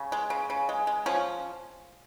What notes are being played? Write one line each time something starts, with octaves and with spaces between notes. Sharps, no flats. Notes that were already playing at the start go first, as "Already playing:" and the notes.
Already playing: C#3
G#3
C#3
C#3
G#3
G#3
F3 C#4